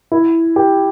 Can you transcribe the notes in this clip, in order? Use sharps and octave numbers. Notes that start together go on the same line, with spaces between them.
E4
G4